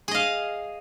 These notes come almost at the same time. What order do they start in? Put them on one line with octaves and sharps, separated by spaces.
G#4 D#5 F5